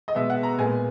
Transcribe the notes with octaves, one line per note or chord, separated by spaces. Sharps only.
D#5
B2 G#3 B3 E5
F#5
A#5
A#2 G#3 B3 G#5